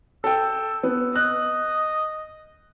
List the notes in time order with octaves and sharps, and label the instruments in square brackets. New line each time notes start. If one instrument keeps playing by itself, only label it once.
[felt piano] A4 G5 [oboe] E6
[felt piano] B3
[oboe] D#5 [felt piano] F#6